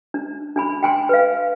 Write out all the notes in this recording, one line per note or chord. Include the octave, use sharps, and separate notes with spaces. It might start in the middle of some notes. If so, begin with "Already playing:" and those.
D4
D4 G#5 B5
G5 G#5 C6
B4 F5